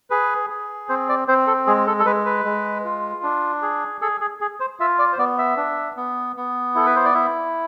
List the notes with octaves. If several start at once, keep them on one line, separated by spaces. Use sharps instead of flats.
G#4 B4
G#4
C4 C5
D5
C4 C5
A4
G#3 G#4
A4
A4
G#3 B4
B4
G#3
F4
D4
G#4
G#4 A4
G#4
G#4
C5
F4 E5
D5
C5
B3 D5
E5
D4
B3
B3
E4 A4
B4
C5
D5
E4 E5